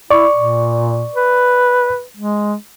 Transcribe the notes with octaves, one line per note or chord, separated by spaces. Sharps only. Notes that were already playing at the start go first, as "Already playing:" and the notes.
E4 D5 C#6
A#2
B4
G#3